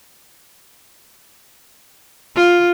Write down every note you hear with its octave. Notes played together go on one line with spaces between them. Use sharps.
F4